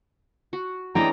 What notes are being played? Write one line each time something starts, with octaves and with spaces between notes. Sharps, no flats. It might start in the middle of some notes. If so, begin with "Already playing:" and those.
F#4
E3 G#3 C#4 D4 D#5 G5 A#5